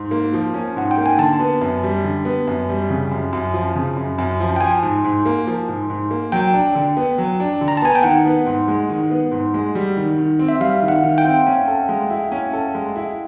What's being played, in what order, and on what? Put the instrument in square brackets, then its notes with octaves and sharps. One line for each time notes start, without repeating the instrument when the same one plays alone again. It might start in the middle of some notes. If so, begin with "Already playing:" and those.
Already playing: [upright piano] G#2
A#3
F3
C#4
[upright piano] G#2 [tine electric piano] F#5
[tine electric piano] G5
[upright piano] A#3
[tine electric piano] G#5
[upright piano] D3 [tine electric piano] A5
[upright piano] B3
F#2
G3
D3
B3
F#2
G3
C#3
F#2
F#2
F3
C#3
F#2
F#2
F3
[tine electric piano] G5
[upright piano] F3 [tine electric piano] G#5
[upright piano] G#2
G#2
A#3
F3
G#2
G#2
A#3
[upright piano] F#3 [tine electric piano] G5
[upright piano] D4
D3
B3
F#3
D4
D3
[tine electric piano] A#5
A5
[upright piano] B3 [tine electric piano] G#5
[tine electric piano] G5
[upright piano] D#3 [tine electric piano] F#5
[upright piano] B3
G#2
G#3
D#3
B3
G#2
G#3
G3
D#3
D#3
C4
[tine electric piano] E5
[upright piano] G3 [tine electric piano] F5
[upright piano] D#3
[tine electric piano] F#5
[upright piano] D#3
[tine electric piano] G5
[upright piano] C4
C#4
A4
G#3
E4
C#4
A4
G#3
E4